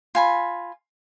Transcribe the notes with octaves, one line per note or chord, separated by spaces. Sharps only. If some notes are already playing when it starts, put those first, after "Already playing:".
F4 G#5 B5